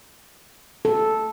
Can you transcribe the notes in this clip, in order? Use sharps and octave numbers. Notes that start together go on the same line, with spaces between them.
A4